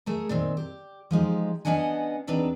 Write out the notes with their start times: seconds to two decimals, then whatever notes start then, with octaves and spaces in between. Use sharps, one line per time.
0.06 A3 G#4 A#4
0.29 A#2 D#3 C4
0.57 G4
1.11 F3 G#3 D#4 G4
1.65 B3 C#4 D4 D#5 F#5 G#5
2.27 E2 C4 D4 D#4 B4 A#5